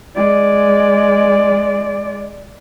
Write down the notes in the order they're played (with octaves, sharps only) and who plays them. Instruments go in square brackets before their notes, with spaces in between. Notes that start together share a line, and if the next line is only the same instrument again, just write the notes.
[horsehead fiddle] G#3 D5